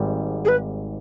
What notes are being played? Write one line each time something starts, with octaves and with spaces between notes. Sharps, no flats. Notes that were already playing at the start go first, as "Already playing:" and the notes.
Already playing: G#1 G#2 G3
G#4
B4